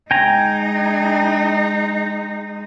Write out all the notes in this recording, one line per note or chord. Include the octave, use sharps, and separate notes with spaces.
G#3 D#4 G5 G#5 A#5